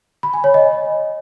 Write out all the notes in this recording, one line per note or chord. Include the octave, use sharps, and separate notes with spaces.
B5
G#5
C#5
D#5